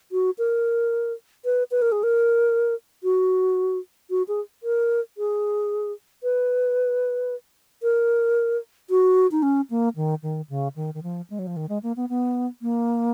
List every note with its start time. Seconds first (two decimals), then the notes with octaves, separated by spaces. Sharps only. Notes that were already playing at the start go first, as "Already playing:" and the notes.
0.12 F#4
0.38 A#4
1.45 B4
1.71 B4
1.82 A#4
1.92 G#4
2.03 A#4
3.03 F#4
4.10 F#4
4.28 G#4
4.63 A#4
5.18 G#4
6.23 B4
7.83 A#4
8.90 F#4
9.31 D#4
9.42 C#4
9.70 A#3
9.96 D#3
10.23 D#3
10.49 C#3
10.76 D#3
10.94 D#3
11.03 F3
11.30 G#3
11.39 F#3
11.47 F3
11.56 D#3
11.69 G#3
11.83 A#3
11.96 B3
12.09 B3
12.62 A#3